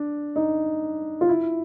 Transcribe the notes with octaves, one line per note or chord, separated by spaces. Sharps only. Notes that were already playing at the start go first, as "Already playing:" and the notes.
Already playing: D4
D#4
F4
E4